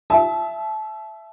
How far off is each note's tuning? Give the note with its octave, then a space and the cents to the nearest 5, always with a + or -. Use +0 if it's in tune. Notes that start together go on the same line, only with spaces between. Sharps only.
E5 +10 A5 -30 E6 -45